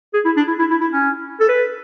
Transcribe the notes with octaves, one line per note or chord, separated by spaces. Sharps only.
G#4
E4
D4
E4
E4
E4
E4
C#4
A4
B4